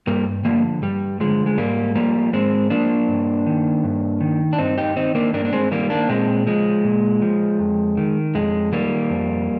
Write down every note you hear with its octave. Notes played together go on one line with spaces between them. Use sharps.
G2 G3 A#3
D3 F3 G3 A#3
G2 G3
D3 F3 G#3
G#3
G#2 G3 A#3
F3 G3 A#3
G#2 G#3 C4
F3 A#3 D4
G2
D#3
G2
D#3
D4
G2 C4 D#4
D#4 G4
D#3 C4 D#4
A#3 D4
G2 A#3 D4
D4
G#3 C4
D#3 G3 A#3
A#3 D4
A#2 G#3 C4
F3 G#3
A#2
F3
F2
D#3
F2 G#3
D#3 G3 A#3
F2